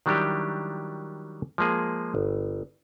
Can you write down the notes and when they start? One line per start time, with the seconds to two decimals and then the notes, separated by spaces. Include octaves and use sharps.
0.06 D#3 F#3 G3 D4 E4 G4
1.58 F3 G#3 A#3 G#4
2.15 G1